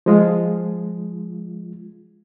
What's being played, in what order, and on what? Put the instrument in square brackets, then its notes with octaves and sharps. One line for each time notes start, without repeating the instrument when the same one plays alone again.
[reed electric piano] F3 G#3 F4